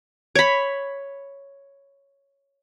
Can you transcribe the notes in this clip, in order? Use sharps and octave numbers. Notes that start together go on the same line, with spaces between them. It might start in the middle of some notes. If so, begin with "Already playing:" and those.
C#5 B5